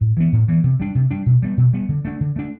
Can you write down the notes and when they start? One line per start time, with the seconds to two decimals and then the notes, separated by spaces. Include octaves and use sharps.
0.01 A2
0.17 E3 B3
0.33 A2
0.48 E3 B3
0.64 C3
0.80 G3 D4
0.95 C3
1.11 G3 D4
1.26 B2
1.42 G3 B3
1.57 B2
1.73 G3 B3
1.89 D3
2.05 A3 D4
2.21 D3
2.36 A3 D4